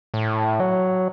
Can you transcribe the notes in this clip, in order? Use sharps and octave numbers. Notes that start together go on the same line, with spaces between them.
A2
F#3